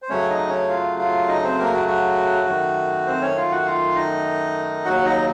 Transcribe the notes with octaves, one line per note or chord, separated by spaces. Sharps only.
C5
F#2 C#3 F#3 A3 C#4 C#5
D#4 D#5
C#4 C#5
F4 F5
F4 F5
D#4 D#5
C4 C5
A#3 A#4
F#4
F#4
F#2 D#3 A3
C4 C5
C#4 C#5
F4 F5
F#4 F#5
F4 F5
D#4 D#5
D#2 C#3 F#3 F#4 F#5
D#4 D#5